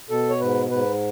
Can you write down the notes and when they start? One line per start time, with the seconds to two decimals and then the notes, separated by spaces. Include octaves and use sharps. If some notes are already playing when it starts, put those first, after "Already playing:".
0.09 B2 A4
0.30 C#5
0.40 G#2 B4
0.71 G#2 B4